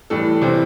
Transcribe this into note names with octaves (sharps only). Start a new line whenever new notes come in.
A2 E3 G3 A4
C3 E3 G3 C5